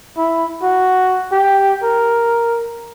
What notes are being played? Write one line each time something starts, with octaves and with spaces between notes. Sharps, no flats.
E4
F#4
G4
A#4